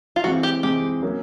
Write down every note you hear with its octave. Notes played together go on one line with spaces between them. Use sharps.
F4
E3 G#3 C4 F#4
G4
E3 G#3 C4 G4
F#3 A#3 C#4